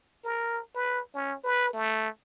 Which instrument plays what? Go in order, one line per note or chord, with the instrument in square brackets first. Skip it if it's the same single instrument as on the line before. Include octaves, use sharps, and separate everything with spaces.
[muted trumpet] A#4
B4
C#4
B4
A3